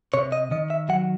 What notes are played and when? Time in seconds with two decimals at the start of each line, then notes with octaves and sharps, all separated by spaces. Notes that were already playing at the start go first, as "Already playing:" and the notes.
0.14 C3 C#5
0.32 D#5
0.51 D#3 D#5
0.70 E5
0.89 F#3 F#5